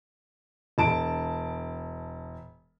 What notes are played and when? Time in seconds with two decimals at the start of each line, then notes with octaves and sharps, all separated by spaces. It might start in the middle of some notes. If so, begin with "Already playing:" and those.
0.78 E1 A5 D7